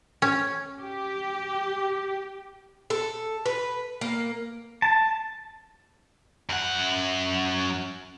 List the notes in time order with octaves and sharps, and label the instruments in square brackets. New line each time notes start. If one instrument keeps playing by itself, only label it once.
[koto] C#4
[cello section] G4
[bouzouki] A4
B4
A#3
[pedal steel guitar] A5
[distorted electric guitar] F#2 F#5